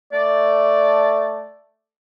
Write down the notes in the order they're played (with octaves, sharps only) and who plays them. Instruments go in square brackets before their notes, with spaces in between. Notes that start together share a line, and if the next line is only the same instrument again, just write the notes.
[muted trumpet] A3 [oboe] D5